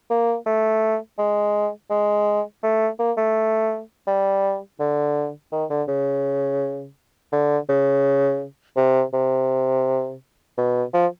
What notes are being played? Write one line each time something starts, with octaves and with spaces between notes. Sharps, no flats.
A#3
A3
G#3
G#3
A3
A#3
A3
G3
D3
D#3
D3
C#3
D3
C#3
C3
C3
B2
F3